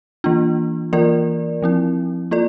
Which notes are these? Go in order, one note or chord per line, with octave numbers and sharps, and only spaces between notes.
E3 A#3 D4 F4
E3 A#3 F4 A#4 D5
F3 C4 E4
A#3 F4 A4 D5